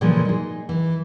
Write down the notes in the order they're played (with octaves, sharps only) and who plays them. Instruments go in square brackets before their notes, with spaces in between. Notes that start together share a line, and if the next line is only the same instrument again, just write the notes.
[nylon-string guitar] A#2 C#3 E3 F3 G#3 A3
D#4 G#4
E3